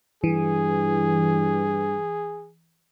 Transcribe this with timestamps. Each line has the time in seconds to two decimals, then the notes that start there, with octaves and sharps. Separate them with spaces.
0.24 G2 E3 G#4